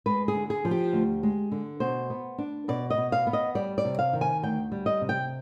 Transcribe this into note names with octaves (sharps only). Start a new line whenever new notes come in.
G#3 B4
G#4
D3
G#4
F3
G4
D2
G#3
D3
B2 C5
B3
D4
B2 D5
D#5
B2
F5
B3
D#5
G3 D5
D5
C3
F5
D#3
G#5
D2 G5
G3
D#5
C3
G5